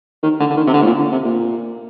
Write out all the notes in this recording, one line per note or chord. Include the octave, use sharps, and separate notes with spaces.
D#3
D3
D3
D#3
C3
D3
A2
A#2
D3
C3
A#2